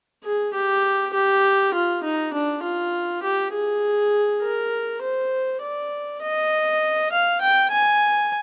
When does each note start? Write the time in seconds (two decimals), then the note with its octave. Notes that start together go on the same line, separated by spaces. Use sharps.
0.24 G#4
0.54 G4
1.14 G4
1.74 F4
2.04 D#4
2.33 D4
2.64 F4
3.23 G4
3.53 G#4
4.42 A#4
5.02 C5
5.62 D5
6.21 D#5
7.12 F5
7.41 G5
7.71 G#5